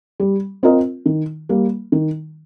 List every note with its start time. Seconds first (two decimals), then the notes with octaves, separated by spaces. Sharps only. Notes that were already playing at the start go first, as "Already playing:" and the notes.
0.20 G3
0.63 C4 F4 A#4 D#5
1.06 D#3
1.49 G3 A#3
1.92 D#3